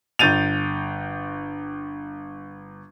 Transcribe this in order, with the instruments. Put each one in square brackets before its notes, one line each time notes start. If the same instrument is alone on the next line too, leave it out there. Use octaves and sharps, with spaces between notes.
[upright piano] G1 G6 A6 D#7 F7